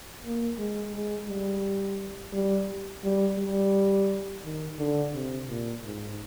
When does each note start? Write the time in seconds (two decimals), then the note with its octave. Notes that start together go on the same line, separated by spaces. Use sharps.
0.24 A#3
0.58 G#3
0.94 G#3
1.29 G3
2.33 G3
3.04 G3
3.38 G3
4.44 D#3
4.79 D3
5.13 C3
5.49 A#2
5.84 G#2